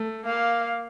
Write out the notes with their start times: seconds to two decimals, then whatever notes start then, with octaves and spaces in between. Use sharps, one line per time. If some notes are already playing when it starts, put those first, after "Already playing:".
Already playing: A3
0.26 A#3 F5